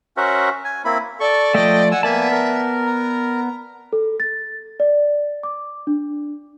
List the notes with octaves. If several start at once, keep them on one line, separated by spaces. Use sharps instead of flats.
C#4 F#4 A#4 C5 E5 F#5
G#5
A#3 C4 E4 B5
A4 D5 C#6
F3 A3 D#5 G5
F#5 G#5 E6
A#3 B3 D5 E5 G#5 A5
A#4
A#5
A4
A6
D5
D6
D4